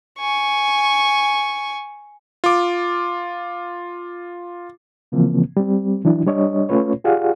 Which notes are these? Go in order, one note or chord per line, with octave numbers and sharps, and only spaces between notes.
G#5 C#6
F4 D6
C#3 E3 F3 A#3 C4
G3 C4
E3 F#3 D4 E4
G3 D4 C#5 D#5
A3 C#4 F4 B4 C#5
F4 G4 G#4 D5 F5 F#5